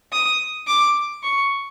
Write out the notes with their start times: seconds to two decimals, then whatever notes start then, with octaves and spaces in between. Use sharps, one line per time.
0.12 D#6
0.67 D6
1.23 C#6